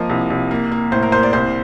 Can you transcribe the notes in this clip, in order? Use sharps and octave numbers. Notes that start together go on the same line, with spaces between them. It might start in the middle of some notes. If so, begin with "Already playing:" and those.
Already playing: F3 A#3 D#5
C2
C2
A#3
A#3
A2 C5
A#4
A#3 C5
D5
C2 C5